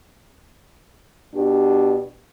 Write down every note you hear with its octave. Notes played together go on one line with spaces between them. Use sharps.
B2 D4 G4